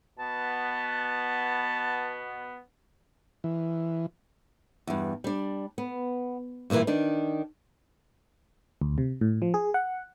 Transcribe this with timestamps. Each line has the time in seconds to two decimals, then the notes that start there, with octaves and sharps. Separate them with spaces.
0.19 B2 B3 A5
3.44 E3
4.87 E2 G2
5.24 G3 D4
5.78 B3
6.70 G2 A#2 D#3 E3 A#3
6.87 D#3 D4
8.82 D2
8.98 C3
9.21 A2
9.42 F3
9.54 G#4
9.74 F#5